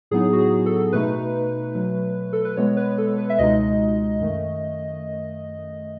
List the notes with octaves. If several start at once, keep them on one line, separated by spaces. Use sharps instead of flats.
A2 F#3 B3 D#4 G#4
F#4
G#4
A4
B2 A3 D#4 B4
B2 F#3 A3
A4
B4
B2 G#3 B3 C#5
B4
A4
B4
E5
C#2 B2 G#3 D#4 D#5
F#2 D#3 A3